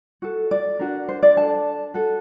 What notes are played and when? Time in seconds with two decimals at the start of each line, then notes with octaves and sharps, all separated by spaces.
0.22 F#4 A4
0.51 D5
0.79 D4 F#4 A#4
1.09 C5
1.23 D5
1.37 D4 A4 A5
1.94 F#4 A4